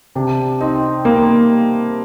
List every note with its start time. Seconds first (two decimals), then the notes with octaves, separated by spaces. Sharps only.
0.15 C3 D4
0.61 C4 D#4
1.05 G3 A#3